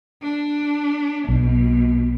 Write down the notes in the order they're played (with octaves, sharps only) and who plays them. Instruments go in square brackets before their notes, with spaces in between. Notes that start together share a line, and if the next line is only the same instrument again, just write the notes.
[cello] D4
[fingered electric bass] B1 [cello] B2